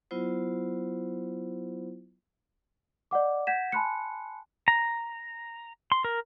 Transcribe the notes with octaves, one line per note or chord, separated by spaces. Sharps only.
F#3 B3 E4 F4 C5
D5 D#5 F#5 D6
F#5 G6 G#6 A#6 B6 E7
G#5 A5 B5 C6 F#6 C#7
A#5
C6
A#4